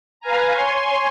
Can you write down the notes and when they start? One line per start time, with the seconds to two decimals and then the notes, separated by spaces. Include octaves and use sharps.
0.20 B4 F5 G#5 A#5
0.53 C#5 G#5 C6